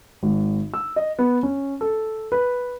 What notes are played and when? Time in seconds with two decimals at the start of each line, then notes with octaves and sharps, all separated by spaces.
0.23 G#1
0.74 E6
0.96 D#5
1.19 B3
1.43 C#4
1.81 A4
2.32 B4